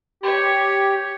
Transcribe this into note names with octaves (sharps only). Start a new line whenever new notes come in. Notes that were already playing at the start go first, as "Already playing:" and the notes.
G4 C#5